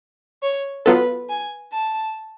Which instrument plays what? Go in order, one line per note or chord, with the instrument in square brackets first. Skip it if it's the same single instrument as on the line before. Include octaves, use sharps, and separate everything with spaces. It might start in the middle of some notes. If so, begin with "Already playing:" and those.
[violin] C#5
[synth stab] F#3 B3 F4 A4 [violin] B4
[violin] G#5
A5